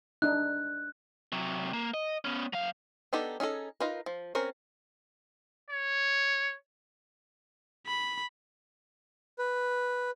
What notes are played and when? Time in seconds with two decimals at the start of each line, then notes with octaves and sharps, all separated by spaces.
0.22 D4 D#4 F#6
1.32 C3 F#3
1.73 A#3
1.94 D#5
2.25 B3 C#4
2.53 F#3 F5
3.13 B3 D4 D#4 G4 A4
3.40 C#4 D#4 G#4 A4
3.80 D#4 F4 A#4 B4
4.06 F3
4.35 C4 C#4 A#4
5.70 C#5
7.87 B5
9.39 B4